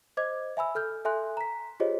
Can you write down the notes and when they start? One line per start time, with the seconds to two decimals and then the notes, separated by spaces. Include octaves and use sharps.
0.17 C5 D#5 D6 G#6
0.57 E5 G#5 B5 E6
0.75 A4 F6 G6
1.05 A4 E5 G#5 C6 F#6
1.37 A#5 B6
1.80 F4 G4 G#4 C5 C#5 D#5